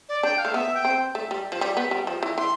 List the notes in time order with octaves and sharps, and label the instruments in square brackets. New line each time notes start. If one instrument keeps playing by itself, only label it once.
[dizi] D5
[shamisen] D4 [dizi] G5
[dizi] F5
[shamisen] A3
[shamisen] B3 [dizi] E5
[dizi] G5
[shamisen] C4
A3
G3
F3
G3
B3
G3
F3
E3
[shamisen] E3 [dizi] C6